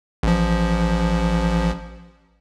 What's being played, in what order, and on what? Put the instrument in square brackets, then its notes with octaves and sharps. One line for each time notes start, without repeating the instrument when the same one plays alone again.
[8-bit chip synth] A1 F3